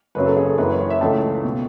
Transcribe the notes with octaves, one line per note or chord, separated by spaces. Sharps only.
F#1 F#2 C#3 F#3 C#4 B4
A4
G#4
A4
F#1 F#2 E3 B4
C#5
C#5
E5
C#2 C#3 E3 A3 A5
B2